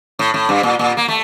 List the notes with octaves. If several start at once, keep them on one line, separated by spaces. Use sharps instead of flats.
A2
A2
G2
A#2
A#2
A#3
A3